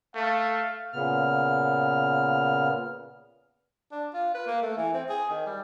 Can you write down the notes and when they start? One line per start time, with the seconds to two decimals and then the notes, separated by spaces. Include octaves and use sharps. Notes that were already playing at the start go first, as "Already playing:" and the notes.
0.15 A3 F5
0.93 A#2 C#3 B3 F6
3.92 D4
4.14 F4
4.35 B4
4.47 A#3
4.62 A3
4.77 E3
4.94 C4
5.09 G#4
5.30 D#3
5.46 G3